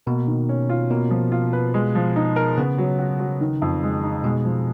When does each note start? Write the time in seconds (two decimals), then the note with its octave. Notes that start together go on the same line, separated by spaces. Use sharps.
0.06 B2 A#3
0.27 D#3
0.49 C#4
0.69 F4
0.90 B2 A#3
1.11 F3
1.32 F4
1.53 B4
1.74 G#3
1.95 F3
2.16 D#4
2.36 A#4
2.57 C#3 B3
2.78 F#3
2.99 F#4
3.20 F#3
3.41 D#3
3.62 F2
3.83 G#3
4.03 D#4
4.24 B2 G#3
4.45 F3